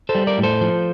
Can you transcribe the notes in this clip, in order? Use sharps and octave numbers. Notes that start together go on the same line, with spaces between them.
A4 C5
G3
A#4 D5
A2
A4 C5
F3